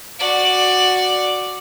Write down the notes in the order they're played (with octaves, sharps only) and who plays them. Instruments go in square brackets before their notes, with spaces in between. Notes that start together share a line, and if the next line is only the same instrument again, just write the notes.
[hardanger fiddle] F#4 D5